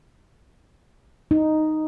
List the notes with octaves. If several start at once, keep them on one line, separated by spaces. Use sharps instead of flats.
D#4